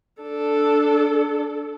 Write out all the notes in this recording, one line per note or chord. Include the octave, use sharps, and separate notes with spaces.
D4 A4